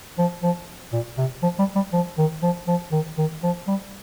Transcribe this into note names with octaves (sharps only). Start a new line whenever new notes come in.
F3
F3
A#2
C3
F3
G3
G3
F3
D#3
F3
F3
D#3
D#3
F3
G3